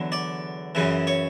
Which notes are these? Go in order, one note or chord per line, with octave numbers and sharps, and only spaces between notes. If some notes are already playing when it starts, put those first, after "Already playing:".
Already playing: E2 D3 F#3
D5
F#2 C#3 E3
C#5